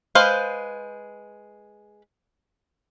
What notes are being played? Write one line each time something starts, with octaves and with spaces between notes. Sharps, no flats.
G#3 B4 C5 F5